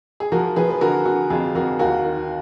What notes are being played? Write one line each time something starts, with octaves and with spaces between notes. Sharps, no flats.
G#4
F3 F#4 A#4
F3 G#4 B4
B4
D3 F#4 A#4
D3 F#4
F2 F4 G#4
F2 F#4 A#4
D#2 F#4 A#4
D#3